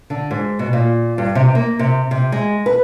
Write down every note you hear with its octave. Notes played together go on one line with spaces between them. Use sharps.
D3
G#2
B2
A#2
G2
C3
A#3
C3
C3
G#3
B4